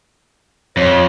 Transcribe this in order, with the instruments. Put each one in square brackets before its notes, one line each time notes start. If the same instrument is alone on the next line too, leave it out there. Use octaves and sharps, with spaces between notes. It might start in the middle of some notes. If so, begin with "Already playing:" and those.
[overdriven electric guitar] F2 [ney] C#5